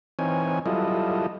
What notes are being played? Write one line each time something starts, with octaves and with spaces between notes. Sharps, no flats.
E3 C4 D#4 C#5 G#5
F#3 G3 E4 F4 A4 D#5